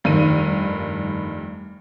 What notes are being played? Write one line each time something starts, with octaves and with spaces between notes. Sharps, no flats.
F1 G2 D#3 D#7